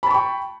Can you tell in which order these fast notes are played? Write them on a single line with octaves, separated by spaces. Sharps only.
B5 A5 C#6 G5